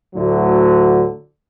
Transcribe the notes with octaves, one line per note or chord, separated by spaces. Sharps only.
D2 A2 D3 F#3